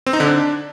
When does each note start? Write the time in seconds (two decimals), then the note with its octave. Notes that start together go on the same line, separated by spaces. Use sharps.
0.07 C4
0.13 D#4
0.20 D3
0.27 D4